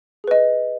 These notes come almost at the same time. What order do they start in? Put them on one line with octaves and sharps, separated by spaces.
G#4 B4 D#5